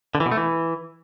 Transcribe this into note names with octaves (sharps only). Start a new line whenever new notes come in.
D3
E3
B2
A3
E3